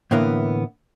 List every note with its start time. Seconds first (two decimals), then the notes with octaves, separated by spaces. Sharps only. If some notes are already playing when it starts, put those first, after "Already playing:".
0.11 A2 D3 E3 A#3 B3